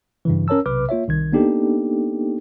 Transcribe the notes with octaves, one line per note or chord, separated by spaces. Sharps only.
G2 C#3 E3
C#4 A#4 C#5 A5 E6
B1 C3 B4 D6 F6
A#3 F4 C#5 E5
C2 D#3 G#6
A#3 B3 D4 D#4 G4 A4